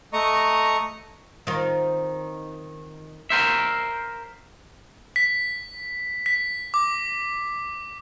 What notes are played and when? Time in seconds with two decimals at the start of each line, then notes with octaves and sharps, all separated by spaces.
0.13 A3 D#5 A#5 C#6 D#6
1.47 D#3 C4 F4
3.30 A#4 C5 E5
5.16 B6
6.26 B6
6.74 D6